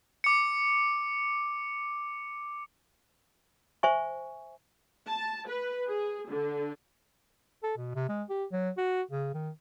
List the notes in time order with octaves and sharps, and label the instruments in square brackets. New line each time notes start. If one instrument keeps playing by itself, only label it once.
[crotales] D6 C#7
[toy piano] C5 E5 G#5 C#6
[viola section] A5
B4
G#4
D3
[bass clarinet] A4
B2
C3
G#3
G4
F#3
F#4
C#3
D#3